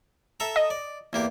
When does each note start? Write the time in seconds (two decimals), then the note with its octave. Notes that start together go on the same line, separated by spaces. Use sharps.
0.40 A4 E5 A#5
0.56 D#5
0.70 D5
1.13 E2 A#3 G4